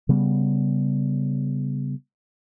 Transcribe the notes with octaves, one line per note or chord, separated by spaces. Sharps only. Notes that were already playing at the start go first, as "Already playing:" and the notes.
C#3 G3 B3